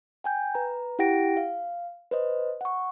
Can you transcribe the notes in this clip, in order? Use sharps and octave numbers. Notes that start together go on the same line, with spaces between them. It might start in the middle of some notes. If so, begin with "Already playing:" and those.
G5 G#5 G6
B4 A#5
E4 G4 F#5 G5 A#6 D7
F5
B4 C5 D#5
F#5 C#6